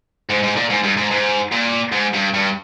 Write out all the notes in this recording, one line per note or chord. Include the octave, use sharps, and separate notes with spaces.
G#2
G#2
A#2
G#2
G2
G#2
G#2
A#2
G#2
G2
G2